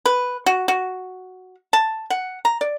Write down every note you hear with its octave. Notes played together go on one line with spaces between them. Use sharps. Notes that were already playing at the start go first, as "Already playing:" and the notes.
B4
F#4
F#4
A5
F#5
A#5
D5